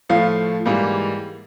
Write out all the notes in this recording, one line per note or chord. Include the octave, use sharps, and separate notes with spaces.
A2 F3 A3 F5
G#2 E3 G3 A#3